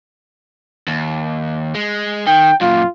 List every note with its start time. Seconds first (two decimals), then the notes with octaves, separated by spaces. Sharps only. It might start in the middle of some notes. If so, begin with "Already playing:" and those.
0.88 D#2
1.75 G#3
2.27 D#3 G5
2.61 F#2 A#2 F4